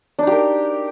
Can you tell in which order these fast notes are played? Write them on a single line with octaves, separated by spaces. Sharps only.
D4 D#4 G4 A#4